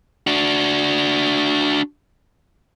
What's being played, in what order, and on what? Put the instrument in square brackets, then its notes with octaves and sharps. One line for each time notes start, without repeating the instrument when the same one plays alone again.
[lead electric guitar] D4 F#4